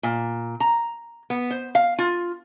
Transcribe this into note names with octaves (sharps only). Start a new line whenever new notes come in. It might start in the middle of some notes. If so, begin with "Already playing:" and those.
A#2
A#5
B3
C5
F5
F4